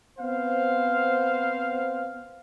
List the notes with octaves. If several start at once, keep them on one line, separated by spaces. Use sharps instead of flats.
B3 C4 C5 F5